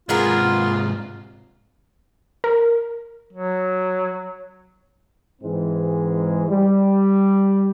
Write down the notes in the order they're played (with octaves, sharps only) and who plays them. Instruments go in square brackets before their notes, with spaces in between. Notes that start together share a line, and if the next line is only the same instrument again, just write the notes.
[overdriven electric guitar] G#2 C3 [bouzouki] B3 G#4 A#4 [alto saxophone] F4
[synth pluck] A#4
[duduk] F#3
[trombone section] G#2 E3 G#3 C4
G3